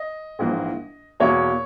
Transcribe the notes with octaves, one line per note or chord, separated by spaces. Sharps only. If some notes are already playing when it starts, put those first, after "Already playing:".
Already playing: D#5
A#1 G#2 E3 A#3
E2 B2 A#3 C#5